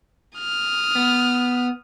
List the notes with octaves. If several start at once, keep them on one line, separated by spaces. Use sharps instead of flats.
D#6 F6
B3